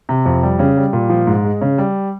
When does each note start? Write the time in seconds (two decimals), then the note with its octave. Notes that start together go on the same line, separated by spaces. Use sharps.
0.09 C3
0.26 F2
0.43 G3
0.59 C#3
0.77 G3
0.93 A#2
1.10 F3
1.27 G#2
1.45 G#3
1.61 C#3
1.78 G3